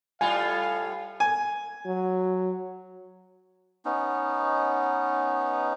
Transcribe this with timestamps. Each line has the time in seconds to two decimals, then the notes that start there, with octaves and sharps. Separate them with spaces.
0.21 A2 G3 F4 F5 G#5
1.20 G#5
1.86 F#3
3.85 B3 C#4 D#4